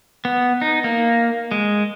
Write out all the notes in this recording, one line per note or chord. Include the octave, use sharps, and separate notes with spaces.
B3
D#4
A#3
G#3